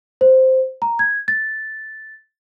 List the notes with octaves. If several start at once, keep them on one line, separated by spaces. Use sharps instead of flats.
C5
A#5
G#6
A6